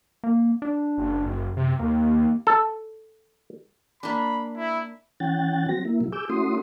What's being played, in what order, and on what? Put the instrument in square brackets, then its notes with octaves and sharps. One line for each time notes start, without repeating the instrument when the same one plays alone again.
[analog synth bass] A#3
D4
[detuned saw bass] F#1
[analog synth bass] F#2
[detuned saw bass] C3
[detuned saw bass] D#2 [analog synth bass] A#3
[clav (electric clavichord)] A4
[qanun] A#3 D4 [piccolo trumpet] B5
[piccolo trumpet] E4
[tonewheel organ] E3 C#4 F#5 G5 A6
F#3 C4 F#4 A#6
A#3 E4
B2 F#3 E4
G#4 D6 E6 G6
A3 C#4 E4 F#4 C6 D#6